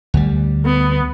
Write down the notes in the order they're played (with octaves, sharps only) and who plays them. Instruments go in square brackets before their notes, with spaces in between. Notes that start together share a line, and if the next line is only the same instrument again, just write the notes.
[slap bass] D2 G3
[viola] B3